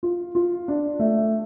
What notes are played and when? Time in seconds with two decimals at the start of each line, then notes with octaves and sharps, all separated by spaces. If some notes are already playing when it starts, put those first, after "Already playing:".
0.03 F4
0.35 F4
0.68 D4
0.99 A3